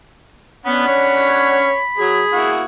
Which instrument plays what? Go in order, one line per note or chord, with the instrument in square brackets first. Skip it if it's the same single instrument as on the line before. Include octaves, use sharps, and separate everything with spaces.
[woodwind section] B3 [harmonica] C#4 D4 F#5 [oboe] B5
[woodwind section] C#5
[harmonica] F#3 [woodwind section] G#4
[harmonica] A#3 E4 F#4